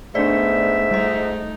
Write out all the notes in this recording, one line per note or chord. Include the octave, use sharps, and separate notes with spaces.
G#2 A3 B3 D4 D5 E5
G3 A3 D#4 D#5